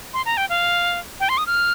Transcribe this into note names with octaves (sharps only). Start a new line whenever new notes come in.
C6
A#5
G5
F5
G5
C6
D#6
F6